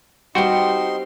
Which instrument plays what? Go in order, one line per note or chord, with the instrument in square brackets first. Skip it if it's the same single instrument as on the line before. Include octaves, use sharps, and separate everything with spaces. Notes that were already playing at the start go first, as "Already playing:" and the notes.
[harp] G3 C4 [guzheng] B3 G4 [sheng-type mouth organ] D#4 C6 [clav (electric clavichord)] F#4 G5